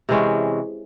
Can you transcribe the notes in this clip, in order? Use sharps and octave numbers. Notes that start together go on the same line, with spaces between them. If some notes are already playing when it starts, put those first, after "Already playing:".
C3 E3 G#3 C#4